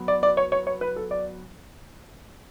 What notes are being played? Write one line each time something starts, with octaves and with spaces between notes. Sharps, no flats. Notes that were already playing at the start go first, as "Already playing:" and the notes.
Already playing: F#3 B3
D5
D5
C#5
C#5
C#5
B4
A4
D5